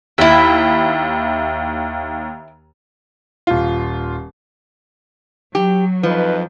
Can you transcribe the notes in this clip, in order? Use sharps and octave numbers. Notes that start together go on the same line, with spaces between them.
D#2 E4 E5
D#1 F4
F#3 G4
F2 F3 D#4 B4